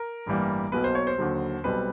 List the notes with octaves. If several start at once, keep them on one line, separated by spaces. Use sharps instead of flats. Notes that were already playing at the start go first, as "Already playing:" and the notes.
Already playing: A#4
A1 G2 E3 G3 A#3
B1 B2 F#3 A#3 B4
C5
C#5
C5
D#2 D3 F#3
B1 B2 G3 C4 B4